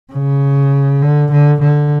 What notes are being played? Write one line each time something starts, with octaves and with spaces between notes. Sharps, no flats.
C#3
D3
D3
D3